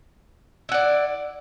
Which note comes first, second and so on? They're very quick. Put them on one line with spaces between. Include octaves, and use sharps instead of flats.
E4 F#5 D5